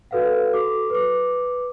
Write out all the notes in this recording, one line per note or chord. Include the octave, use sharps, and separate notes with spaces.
F#4 A4 B4 F5 F#5
F#4 A4 D6
B4 D6